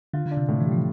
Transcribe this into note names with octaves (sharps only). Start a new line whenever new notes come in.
D3 F4
D3
D4
C3
A2 C3
E3
G3
F3